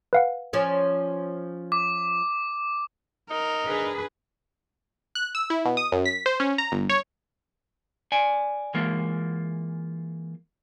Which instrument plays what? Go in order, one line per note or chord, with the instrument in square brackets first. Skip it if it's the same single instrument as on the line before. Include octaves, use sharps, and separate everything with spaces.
[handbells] B4 F5 F#5
[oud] F3 C#4 D5
[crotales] D6
[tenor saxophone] D#4 [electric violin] A#4
[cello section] D4 G#4 B4
[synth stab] F#6
E6
E4
B2
D#6
F#2
B6
C5
C#4
A#5
G1
C#5
[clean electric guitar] D5 G#5
E3 G#3 A#3 F4